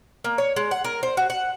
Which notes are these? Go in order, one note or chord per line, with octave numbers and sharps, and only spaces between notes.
A#3
C#5
G#3
F#5
A#4
C5
F#4
F#5